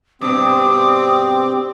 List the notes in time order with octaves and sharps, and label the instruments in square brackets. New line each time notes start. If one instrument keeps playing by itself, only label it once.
[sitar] G2 B2 [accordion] C4 [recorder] D6 [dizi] D#6